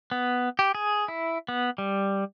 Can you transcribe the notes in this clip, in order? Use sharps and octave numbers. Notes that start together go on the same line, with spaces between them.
B3
G4
G#4
E4
B3
G3